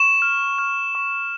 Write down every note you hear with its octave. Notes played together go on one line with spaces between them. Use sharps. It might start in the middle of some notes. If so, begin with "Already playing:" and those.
Already playing: C#6 E7
F6
F6
C#6